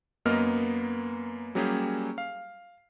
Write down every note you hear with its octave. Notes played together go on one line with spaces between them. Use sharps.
F#2 A#3 B3 D#5 F6
F#3 G3 A#3 C#4 G4 G#4
F5